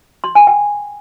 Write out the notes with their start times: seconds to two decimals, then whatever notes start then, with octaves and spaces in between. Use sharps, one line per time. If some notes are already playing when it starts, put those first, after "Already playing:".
0.24 C6
0.35 G#5
0.47 G5